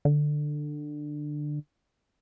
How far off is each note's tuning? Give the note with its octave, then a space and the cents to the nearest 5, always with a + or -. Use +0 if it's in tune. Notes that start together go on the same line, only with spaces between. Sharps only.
D3 +15